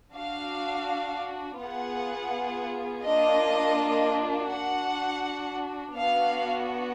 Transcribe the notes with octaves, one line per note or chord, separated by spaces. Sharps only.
D4 F#4 F5
B3 F4 G#4 F#5
A#3 D4 F4 D#5
D4 F#4 F#5
B3 D4 F#4 F5